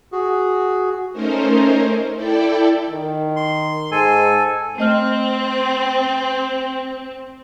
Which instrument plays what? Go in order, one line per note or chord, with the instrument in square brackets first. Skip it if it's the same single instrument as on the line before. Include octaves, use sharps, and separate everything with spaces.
[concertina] F#4 G#4
[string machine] A3 C#4 D#4 A#4 C5
E4 A4 D5 G5
[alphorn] D#3
[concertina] C6
[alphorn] G#2 [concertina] A4 G#5
[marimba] A3 D#5 F6 [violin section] C4